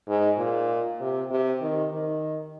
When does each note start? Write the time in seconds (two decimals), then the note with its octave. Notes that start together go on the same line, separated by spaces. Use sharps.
0.08 G#2
0.38 A#2
1.01 C3
1.31 C3
1.62 D#3
1.93 D#3